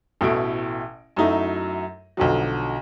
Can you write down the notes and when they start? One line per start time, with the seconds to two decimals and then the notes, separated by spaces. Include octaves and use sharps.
0.21 A1 B2 A3 E4 D7
1.17 F#2 F#3 A3 D#4 E4
2.17 B1 D3 F3 F#3